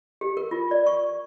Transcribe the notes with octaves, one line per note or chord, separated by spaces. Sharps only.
G4
A#4
F4
D5
C#6